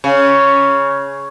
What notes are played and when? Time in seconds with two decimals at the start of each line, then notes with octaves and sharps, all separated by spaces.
0.04 C#3